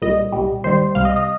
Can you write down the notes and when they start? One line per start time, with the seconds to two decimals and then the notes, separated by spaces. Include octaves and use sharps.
0.02 C2 A#2 G3 D#5
0.33 C2 A#2 G3
0.64 D#2 D#3 G3 C5
0.95 C2 C3 G3 F5
1.05 D#5
1.16 D#5